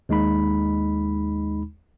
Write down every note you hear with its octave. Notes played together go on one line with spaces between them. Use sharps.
D#2 G#3 D#4 B5